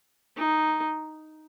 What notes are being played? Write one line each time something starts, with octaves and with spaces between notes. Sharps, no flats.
D#4